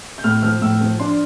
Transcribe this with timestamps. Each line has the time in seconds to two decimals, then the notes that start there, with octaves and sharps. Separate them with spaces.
0.18 G6
0.24 A2 F6
0.42 F3 F6
0.61 A2 E6
0.81 F3
0.99 D4 C6